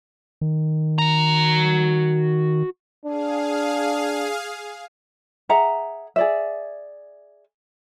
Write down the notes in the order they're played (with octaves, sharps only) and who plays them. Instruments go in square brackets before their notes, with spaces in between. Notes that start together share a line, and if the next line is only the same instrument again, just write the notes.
[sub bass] D#3
[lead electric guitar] F#4 A#5
[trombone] D4 [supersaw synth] G#4 F5
[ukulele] G#4 E5 F#5 A#5
G#4 D5 E5